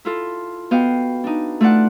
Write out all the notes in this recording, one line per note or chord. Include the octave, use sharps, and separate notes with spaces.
E4 F4 A4
B3 F#4 D#5 F5 G5
D4 D#4
A3 F4 A4 D5 F#5 F#6